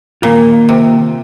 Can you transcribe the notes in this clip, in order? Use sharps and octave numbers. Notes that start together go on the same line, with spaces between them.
A#2 D#3 A#3 F4
C3